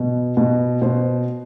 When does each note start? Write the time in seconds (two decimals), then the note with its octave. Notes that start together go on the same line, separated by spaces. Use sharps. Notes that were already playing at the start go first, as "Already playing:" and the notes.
Already playing: B2
0.37 B2
0.82 B2 C5